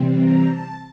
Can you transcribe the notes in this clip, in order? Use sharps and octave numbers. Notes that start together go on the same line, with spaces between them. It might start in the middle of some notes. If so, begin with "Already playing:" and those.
Already playing: C3 E3 G3 C4
A#5
A5